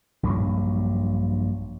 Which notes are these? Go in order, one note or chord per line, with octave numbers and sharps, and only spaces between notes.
A#1 G2 F#3